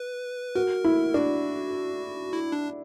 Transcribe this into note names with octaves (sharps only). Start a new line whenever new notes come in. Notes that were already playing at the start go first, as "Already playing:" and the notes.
Already playing: B4
F#4 A#4
E4
D4 F#4
E4
D4